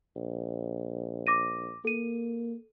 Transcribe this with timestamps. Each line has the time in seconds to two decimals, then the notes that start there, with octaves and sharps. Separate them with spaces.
0.16 A#1
1.27 D6 A#6 D#7
1.85 A#3 A4 D#7